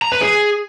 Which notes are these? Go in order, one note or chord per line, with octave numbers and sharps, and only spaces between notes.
A#5
B4
G#4